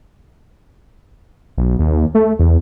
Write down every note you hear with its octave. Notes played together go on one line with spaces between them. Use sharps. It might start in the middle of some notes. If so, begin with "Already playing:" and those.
B1
D#2
A3
E2